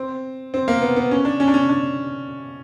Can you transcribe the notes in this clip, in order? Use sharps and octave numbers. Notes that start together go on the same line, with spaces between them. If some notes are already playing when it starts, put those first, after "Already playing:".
Already playing: C4
C4
A#3
B3
B3
C#4
D4
C#4
D4
C#4
D4